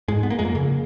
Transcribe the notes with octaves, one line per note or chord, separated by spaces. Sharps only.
G#2 G#3
B3
A#3
F2 G#3
A#3
C#3